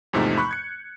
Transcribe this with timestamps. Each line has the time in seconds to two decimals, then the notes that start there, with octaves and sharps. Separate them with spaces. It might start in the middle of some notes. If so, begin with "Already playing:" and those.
0.13 E2 G#2 C3 F3 A3 D#4
0.37 B5 C#6 F#6 G6
0.51 G#6 C#7